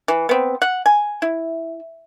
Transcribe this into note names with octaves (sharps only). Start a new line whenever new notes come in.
E3
B3 C4
F#5
G#5
E4